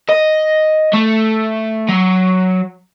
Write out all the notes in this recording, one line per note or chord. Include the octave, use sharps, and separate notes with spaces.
D#5
A3
F#3